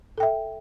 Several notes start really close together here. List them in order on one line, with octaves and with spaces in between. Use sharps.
A4 G5 E5